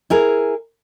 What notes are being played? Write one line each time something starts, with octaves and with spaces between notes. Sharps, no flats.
E4 G#4 A#4